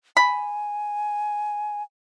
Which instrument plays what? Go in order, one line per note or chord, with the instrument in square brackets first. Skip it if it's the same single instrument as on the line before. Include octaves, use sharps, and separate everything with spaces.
[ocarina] G#5 [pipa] B5